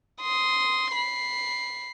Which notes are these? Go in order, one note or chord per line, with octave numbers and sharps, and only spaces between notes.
C6 D#6
B5 C7